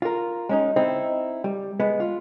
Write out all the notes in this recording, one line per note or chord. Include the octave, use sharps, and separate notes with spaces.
F4 A#4
G#3 C#4 D#4
C4 D#4 E4
G3
G#3 B3
F4